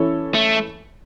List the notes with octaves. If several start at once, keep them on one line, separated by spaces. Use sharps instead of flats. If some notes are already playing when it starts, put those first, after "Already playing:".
Already playing: E3 C#4 E4 A4 C#5
A3